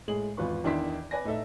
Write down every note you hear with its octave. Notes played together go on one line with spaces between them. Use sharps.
A2 G#3 G#4 F#7
G#1 E2 F4 B4 C#6
E2 D#3 D4 E4 C6 B6
B4 D5 G#5 A#6
A2 D#4 A4 E5